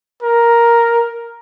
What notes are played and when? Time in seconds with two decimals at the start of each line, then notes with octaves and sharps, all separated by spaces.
0.22 A#4